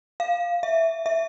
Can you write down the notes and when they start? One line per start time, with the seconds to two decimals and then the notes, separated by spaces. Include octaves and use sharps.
0.20 F5
0.63 E5
1.06 E5